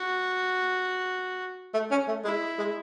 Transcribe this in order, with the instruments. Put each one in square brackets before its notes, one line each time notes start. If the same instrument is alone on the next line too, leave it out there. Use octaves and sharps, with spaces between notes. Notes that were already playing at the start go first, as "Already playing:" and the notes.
Already playing: [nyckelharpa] F#4
[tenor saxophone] A3
C#4
A3
[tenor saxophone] G#3 [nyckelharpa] E4
[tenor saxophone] G#3